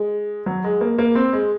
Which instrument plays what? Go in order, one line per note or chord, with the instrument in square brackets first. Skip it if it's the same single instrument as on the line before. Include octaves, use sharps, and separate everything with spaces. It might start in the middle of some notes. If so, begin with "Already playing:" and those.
Already playing: [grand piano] G#3
F#3
G#3
A#3
A#3
C4
G#3